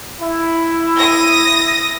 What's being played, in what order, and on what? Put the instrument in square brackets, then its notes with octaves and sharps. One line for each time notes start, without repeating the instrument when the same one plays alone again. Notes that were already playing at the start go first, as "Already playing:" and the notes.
[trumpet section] E4
[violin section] D#6 A#6